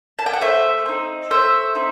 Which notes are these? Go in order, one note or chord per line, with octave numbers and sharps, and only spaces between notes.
A5
G5
F#5
A3 C5 E5
C4 D#4
A3 C5 E5
C4 D#4